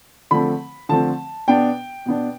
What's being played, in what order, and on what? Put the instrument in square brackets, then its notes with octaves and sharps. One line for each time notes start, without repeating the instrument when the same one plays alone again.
[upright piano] D3 F3 A3 C4 B5
D3 F3 A3 C4 A5
B2 B3 D4 G5
B2 B3 D4